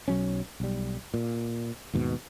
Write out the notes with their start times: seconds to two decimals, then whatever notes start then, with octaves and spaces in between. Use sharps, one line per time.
0.08 B1 F#3 C#4
0.60 B1 G3
1.14 A#2
1.94 D#2 G#2 B2